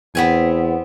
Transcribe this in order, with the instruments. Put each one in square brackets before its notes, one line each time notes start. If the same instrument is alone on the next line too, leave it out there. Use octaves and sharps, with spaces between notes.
[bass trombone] E2 [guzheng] B3 C4 G#5